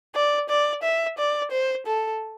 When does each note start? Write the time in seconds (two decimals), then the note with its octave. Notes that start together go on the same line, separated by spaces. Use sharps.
0.15 D5
0.49 D5
0.83 E5
1.18 D5
1.51 C5
1.86 A4